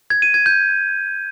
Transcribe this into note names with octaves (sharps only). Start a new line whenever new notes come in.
G#6
D#7
G#6
G6